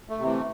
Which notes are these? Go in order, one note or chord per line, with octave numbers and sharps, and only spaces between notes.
A3
C3
E3 A3